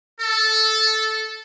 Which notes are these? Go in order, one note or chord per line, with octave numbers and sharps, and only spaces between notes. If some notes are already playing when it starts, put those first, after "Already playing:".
A4